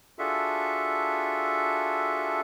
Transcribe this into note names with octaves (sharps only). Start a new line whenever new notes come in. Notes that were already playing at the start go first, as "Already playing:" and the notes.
D4 F4 F#4 G#4 A4 E5